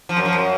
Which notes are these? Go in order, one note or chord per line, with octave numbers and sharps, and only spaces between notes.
F3
F#2
F3
F#2